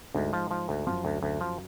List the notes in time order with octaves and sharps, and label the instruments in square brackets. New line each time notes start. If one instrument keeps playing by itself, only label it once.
[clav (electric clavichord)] D2 [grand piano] G#2 G#3
[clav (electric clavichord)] F3
F3
D2
[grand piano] F#2 F#3 [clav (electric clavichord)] F3
[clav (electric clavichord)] D2
D2
F3